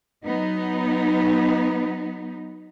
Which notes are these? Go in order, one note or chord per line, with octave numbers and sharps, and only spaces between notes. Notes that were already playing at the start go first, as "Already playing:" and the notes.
F#3 B3 D#4